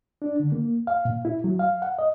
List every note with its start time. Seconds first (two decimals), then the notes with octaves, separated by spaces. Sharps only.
0.22 D4
0.40 D3
0.52 A#3
0.87 F5
1.05 A#2
1.25 E4
1.44 F#3
1.59 F5
1.82 F#5
1.99 D#5